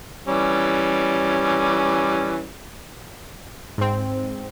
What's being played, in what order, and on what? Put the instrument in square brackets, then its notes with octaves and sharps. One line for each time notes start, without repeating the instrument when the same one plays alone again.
[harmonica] E3 G3 C#4
[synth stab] G#2 C4